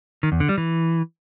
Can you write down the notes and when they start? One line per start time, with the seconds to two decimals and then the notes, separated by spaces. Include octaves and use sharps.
0.23 D#3
0.32 E2
0.40 D3
0.49 G3
0.58 E3